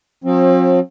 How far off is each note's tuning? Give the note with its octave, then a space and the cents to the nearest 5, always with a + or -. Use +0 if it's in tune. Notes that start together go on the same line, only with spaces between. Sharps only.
F3 +45 C4 +35